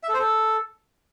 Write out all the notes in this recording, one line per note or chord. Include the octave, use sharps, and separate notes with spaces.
E5
A4
C5
A4